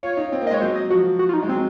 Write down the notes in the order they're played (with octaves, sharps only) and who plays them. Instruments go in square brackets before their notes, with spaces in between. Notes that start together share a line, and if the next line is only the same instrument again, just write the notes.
[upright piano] F4 [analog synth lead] C#5
[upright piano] D#4
C4
A#3
[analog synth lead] D#5
[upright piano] G#3 [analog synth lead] C#5
[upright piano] F#3 [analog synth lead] C5
[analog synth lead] D#5
[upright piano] F3 [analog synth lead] F#4
[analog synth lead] F#4
F4
D#4
[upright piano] G#3
[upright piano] F#3 [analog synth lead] C4